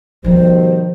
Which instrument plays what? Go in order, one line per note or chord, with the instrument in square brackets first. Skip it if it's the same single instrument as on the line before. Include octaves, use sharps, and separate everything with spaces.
[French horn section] B2 D#3 G3 [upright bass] F3 D#4 [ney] C5